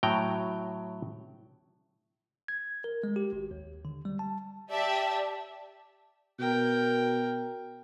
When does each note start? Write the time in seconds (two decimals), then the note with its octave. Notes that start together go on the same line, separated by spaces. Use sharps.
0.03 A2 F#3 G5 A#5
2.48 G#6
2.84 A#4
3.04 G#3
3.16 G4
3.33 G#1
3.51 D#2
3.85 D3
4.05 G3
4.19 A5
4.71 G4 D5 E5 A5
6.39 B2 A#4 G5